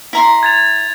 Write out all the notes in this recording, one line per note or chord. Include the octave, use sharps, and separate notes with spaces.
E4 A#5 C6
G#6 A6 F7